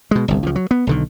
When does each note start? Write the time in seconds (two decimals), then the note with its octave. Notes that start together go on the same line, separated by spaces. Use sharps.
0.11 B2 G#3
0.28 G1 C2
0.43 C#2 F3
0.56 F#3
0.71 B3
0.87 B1 D3 D#3